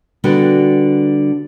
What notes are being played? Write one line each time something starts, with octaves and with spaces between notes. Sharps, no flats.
D3 G3 B3 F#4